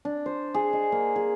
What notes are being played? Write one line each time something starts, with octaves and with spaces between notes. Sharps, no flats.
D4
C5
G#4
D#5
A#3
G#4